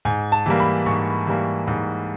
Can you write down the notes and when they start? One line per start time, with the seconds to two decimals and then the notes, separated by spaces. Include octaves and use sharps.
0.05 G#2 G#5
0.32 A5
0.46 E3 G3 A#3
0.60 B5
0.86 G#2 C#6
1.27 E3 G3 A#3
1.67 G#2